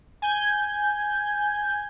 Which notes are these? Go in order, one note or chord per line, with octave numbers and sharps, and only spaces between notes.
G#5 G6 G#6